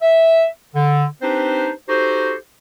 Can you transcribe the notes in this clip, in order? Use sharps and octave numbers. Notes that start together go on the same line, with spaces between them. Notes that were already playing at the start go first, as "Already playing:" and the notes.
E5
D3
C4 D4 D#4 G4 B4 C5
D#4 F#4 G4 A4 C5